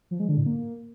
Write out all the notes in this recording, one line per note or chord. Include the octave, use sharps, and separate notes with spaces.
F3
G#3
D3
A2
A#3